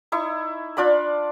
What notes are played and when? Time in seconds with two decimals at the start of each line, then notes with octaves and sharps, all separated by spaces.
0.12 D#4 E4 C#6
0.77 D4 F4 D5 B5